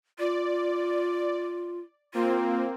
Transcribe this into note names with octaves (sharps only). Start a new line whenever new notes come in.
F4 D5
A#3 C4 F4